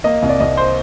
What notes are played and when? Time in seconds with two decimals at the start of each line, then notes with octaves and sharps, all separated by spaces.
0.04 A#3 D#5
0.22 C2
0.29 D5
0.40 C2 D#5
0.57 C5